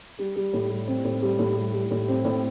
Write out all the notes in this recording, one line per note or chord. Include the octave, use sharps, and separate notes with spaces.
G3
G3
A2
G3
C4
A2
G3
A2
G3
G3
A2
C4
A2